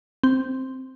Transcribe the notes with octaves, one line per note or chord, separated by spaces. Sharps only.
C4